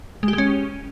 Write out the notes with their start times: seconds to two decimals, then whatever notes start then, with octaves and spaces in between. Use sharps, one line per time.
0.23 G#3
0.28 G4
0.33 G#3
0.38 C#4